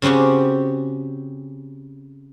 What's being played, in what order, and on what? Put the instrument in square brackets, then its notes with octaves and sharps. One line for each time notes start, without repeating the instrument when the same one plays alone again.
[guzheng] C#3 C4 C#4 F#4 G4